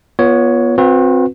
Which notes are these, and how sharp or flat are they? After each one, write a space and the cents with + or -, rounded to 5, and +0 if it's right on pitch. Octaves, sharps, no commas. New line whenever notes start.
B3 -25 F4 +0 C#5 +10
C4 +0 F#4 -45 B4 -5